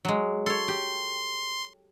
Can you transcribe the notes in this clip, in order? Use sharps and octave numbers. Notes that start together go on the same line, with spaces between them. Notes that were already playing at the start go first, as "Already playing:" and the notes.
F#3 G#3
A4 C#5 C6
G4